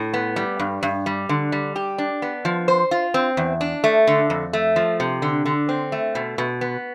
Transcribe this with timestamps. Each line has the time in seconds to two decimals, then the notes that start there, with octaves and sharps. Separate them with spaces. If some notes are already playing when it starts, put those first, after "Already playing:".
Already playing: A2
0.14 B3
0.36 G3
0.60 G2
0.83 G2
1.06 G3
1.29 D3
1.52 G3
1.76 G4
1.98 D4
2.22 B3
2.45 F3
2.68 C5
2.91 F4
3.14 C4
3.37 E2
3.61 D4
3.84 A3
4.07 D3
4.30 F2
4.53 A3
4.76 F3
5.00 C3
5.22 D3
5.46 D3
5.69 C4
5.92 A3
6.15 B2
6.38 B2
6.61 B3